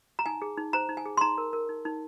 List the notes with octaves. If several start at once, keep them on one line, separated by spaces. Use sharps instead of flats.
A#5
D#4 G#5
G#4
D#4
C5 A#5
D#4
G#5
G#4
C6
D#4 A#5
A#4
A#4
D#4
D#4